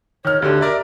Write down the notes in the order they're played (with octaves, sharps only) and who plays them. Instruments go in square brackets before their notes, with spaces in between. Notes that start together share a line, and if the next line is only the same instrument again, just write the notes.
[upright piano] D#3 F6 [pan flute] C#5
[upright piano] D2 D3 [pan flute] G4
[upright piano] A#4 D5 E5